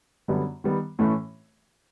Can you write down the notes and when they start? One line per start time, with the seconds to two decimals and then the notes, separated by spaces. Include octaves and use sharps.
0.28 F#2 D3 G3 B3
0.64 D#3 G3 B3
0.99 A2 E3 A3 C#4